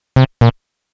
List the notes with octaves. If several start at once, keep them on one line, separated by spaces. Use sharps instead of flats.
C3
A#2